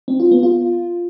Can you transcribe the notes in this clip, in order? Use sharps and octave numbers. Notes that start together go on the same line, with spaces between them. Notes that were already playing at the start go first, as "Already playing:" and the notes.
C4
F4
B3
F4